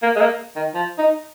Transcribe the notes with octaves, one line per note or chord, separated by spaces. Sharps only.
A#3
G#3
A#3
D#3
F3
D#4